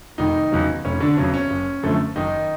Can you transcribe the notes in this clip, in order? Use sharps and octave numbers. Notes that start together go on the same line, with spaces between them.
F1 D#3 D#4
E2 C#3 F#3
F1 C#4
D3 D4
E2 C#3 F#3 C#4
C#4
F#1
F#2 D3 F3 A3
F#1 D#3 D#4